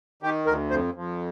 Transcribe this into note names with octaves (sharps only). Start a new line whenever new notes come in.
D#3 G4
D2 A#4
F2 C5
F2